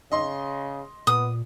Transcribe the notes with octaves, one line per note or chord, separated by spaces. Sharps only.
C#3 D#5 C6
A#2 B3 D#6